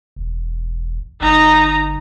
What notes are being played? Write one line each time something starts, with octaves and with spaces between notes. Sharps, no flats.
E1
G1 D#4 A#5